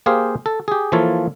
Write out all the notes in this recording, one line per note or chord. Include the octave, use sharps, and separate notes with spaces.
A#3 G4 G#4 C5 F5
A4
G4 G#4
E3 F3 A#3 F4 A4 C#5